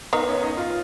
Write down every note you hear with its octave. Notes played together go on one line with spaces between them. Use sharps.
D#3 B3 D#4
C#4
D#4
F4